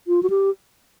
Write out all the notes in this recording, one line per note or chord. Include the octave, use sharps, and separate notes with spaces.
F4
F#4
G4